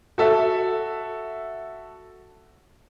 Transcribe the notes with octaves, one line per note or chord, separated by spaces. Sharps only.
F#4 A4 E5